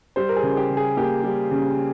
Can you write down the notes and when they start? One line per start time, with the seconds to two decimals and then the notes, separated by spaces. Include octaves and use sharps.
0.16 G3 C5
0.29 A#4
0.36 G#4
0.43 C#3
0.57 G4
0.70 C#3
0.77 G#4
0.97 A#3 G4
1.24 G3
1.51 C#3